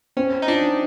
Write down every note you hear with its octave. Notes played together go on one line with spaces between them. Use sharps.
C4 C#4
D#4
D4 F4